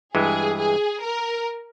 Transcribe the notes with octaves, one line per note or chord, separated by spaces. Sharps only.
G2 E3 G#3 G#4
G#4
A#4